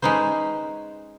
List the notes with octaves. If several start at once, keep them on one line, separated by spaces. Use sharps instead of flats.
G#3 C#4 D#4 B4 C5